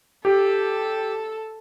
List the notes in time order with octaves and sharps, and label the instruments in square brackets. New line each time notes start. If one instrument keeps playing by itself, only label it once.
[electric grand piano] G4 [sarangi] A4